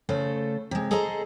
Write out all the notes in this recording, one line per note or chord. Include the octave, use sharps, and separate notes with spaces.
C#3 A3 A4 C5
C3 G#3
G#4 A4 C5 D#5 A#5